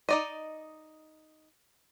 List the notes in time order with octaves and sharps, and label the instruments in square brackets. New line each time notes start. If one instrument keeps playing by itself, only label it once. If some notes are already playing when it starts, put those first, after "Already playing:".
[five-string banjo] D#4 D5 D#5